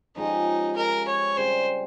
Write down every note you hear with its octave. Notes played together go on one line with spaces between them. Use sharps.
F3 G#3 C#4 D#4 G4
A#4
C#5
C#3 G3 C4 C5